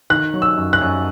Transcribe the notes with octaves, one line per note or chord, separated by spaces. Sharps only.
D#3 F#6
F#3
E6
F#2
F#6
F#2